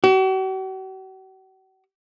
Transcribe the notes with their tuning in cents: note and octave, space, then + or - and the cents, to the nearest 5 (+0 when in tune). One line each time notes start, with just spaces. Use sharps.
F#4 +45